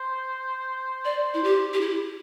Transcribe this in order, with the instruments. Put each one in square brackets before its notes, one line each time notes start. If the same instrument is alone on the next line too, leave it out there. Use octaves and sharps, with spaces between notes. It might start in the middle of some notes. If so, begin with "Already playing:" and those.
Already playing: [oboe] C5
[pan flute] D5
E4
G4
G4
E4